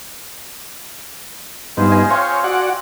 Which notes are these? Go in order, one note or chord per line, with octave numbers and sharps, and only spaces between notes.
G2 B3 D#4 F4 G#4 C5
D#5 G#5
C4 C#5 F5 G#5
F#4 D5 F#5